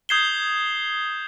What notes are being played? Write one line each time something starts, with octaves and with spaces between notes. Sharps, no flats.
D#6 G6 G#6 C7 E7 G7